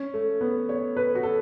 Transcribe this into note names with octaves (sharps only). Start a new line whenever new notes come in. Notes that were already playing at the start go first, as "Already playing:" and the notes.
Already playing: C#4
A3
B3
C#5
B4
F#4
A4